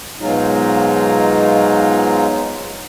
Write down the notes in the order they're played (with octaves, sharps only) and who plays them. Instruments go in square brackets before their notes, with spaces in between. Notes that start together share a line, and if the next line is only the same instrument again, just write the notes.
[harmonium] G#2 B2 F#3 G#3 D#4 F4